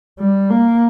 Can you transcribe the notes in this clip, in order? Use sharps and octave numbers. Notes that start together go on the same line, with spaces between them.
G3
A#3